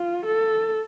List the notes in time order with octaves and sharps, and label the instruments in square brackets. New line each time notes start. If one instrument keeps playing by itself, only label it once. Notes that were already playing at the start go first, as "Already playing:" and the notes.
Already playing: [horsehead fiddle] F4
A4